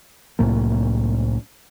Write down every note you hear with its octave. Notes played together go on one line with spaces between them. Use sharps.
C2 A2 F#3 A#3